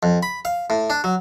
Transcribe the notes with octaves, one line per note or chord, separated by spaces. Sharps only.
F2
B5
F5
A2
D4
F#3